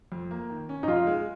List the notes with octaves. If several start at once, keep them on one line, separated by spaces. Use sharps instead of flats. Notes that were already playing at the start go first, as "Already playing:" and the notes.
F2
A#3
D#3
C#4
D#4
F2 F4
G#3